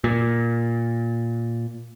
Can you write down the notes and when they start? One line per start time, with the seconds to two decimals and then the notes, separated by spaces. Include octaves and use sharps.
0.04 A#2